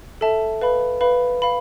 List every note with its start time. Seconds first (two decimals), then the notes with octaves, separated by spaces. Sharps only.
0.21 A4 E5 A5
0.62 B4 F5 B5
1.01 B4 F5 B5
1.42 F5 B5